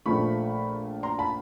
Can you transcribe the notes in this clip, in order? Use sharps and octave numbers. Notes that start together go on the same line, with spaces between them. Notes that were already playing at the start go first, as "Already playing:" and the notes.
A#1 A#2 F3 A3 B5 C#6
A#5 C6
A5 B5